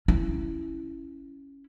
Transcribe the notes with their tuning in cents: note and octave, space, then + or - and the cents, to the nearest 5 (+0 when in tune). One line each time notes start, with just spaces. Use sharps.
C#4 +0 E4 +0